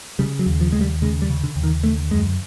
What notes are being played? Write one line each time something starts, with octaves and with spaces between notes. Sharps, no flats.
C#3 G3
F#3
D#2
F3
D#2 G#3
G3
C#3 G#3
G3
C#3
D3
D#2
D#3
D3 A3
F#2 G#3